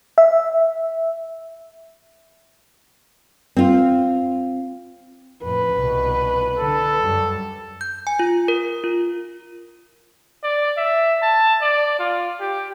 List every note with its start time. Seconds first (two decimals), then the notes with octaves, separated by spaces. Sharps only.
0.18 E5
3.56 C4 F4
5.43 F2 A2 B4
5.73 C2 B2
6.58 D3 A4
7.02 F#2 G3
7.81 G6
8.07 G#5
8.19 F4
8.48 A#4
8.84 F4
10.43 D5
10.78 E5
11.22 A5
11.62 D5
11.99 F4
12.41 G4